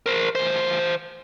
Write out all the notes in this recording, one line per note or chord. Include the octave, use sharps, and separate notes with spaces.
A#4 C5
E3 C5